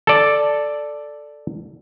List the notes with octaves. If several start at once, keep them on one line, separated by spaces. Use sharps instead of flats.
A4 D5